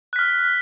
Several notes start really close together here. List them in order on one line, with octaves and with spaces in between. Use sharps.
F#6 B6 F6